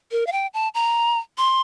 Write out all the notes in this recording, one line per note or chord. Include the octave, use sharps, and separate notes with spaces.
A#4
F5
G5
A5
A#5
C6